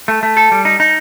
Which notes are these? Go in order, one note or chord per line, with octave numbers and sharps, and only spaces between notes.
A3
A3
A4
G3
D#4
D#4